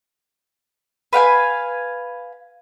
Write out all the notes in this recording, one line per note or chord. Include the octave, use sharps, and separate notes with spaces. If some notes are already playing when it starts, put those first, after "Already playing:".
B4 F5 G5 G#5